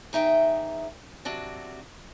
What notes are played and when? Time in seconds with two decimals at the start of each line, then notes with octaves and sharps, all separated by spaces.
0.13 E2 D#4 E5 G5
1.25 C3 F#3 D4 F#4